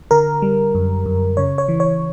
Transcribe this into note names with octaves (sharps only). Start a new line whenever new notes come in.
D3 A#4
G3
F#2
F#2
C#3 C#5
C#5
E3
C#5